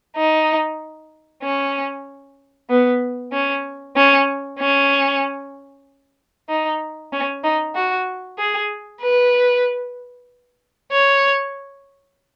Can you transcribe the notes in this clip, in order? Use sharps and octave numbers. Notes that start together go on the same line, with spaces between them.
D#4
C#4
B3
C#4
C#4
C#4
D#4
C#4
D#4
F#4
G#4
B4
C#5